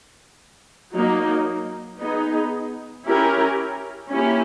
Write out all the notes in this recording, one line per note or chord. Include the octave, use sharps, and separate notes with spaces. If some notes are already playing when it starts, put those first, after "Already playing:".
F#3 A#3 D#4
B3 D#4 G#4
C#4 E4 G4 A#4
A#3 C#4 E4 G4